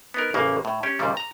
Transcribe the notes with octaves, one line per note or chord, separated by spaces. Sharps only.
B3 D#4 A#4
A1 C#3 A#3
A2
C#4 G4
D#2 A#2 C#3 G3
A#5